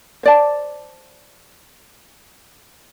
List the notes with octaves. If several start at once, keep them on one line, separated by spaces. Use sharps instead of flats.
C5 D5 A5